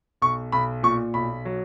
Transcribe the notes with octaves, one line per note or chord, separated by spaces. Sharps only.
B1 C#6
B1 B5
A#2 C#6
B1 B5
F#3